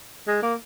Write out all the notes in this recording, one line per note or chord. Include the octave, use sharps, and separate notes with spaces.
G#3
A#3